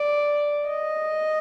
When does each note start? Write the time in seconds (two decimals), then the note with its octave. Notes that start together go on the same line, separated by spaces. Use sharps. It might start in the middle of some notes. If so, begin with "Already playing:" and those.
Already playing: D5
0.68 D#5